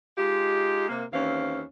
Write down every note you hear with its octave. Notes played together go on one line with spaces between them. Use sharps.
G#3 D#4 F4 G4
C3 A#3
D#2 E3 C4 C#4 F5